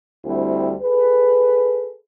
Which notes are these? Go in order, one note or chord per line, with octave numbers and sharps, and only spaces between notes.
D2 G3 C4 E4
G#4 A4 B4